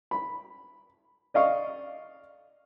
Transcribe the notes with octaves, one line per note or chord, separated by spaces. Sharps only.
B5
D5 D#5 F5 C#6